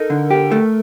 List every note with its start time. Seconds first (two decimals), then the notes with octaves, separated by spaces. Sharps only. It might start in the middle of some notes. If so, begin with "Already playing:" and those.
Already playing: D#4 A4 A#4
0.10 D3
0.30 G4
0.52 A3